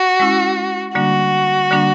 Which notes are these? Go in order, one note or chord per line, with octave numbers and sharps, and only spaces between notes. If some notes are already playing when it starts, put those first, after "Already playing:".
Already playing: F#4
G#3 C#4 E4
D3 G3 A#3 D4 F#4
D3 G3 A#3 D4